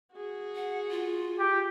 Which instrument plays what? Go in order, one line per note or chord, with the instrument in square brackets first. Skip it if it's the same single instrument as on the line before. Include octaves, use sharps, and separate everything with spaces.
[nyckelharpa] F#4 G#4
[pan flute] F#5
F4
[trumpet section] G4